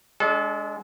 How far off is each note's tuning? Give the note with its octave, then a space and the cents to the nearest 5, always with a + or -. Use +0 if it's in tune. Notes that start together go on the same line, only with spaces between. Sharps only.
G#3 +0 D4 -30 A4 -35